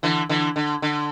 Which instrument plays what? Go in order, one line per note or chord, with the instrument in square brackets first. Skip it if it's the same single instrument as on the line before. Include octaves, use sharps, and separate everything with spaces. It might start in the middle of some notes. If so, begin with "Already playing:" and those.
[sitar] D3 E3
D3 E3
D3
D3